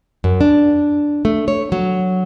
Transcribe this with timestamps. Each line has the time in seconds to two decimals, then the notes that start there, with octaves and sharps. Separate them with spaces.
0.24 F#2
0.41 D4
1.25 A3
1.48 C#5
1.72 F#3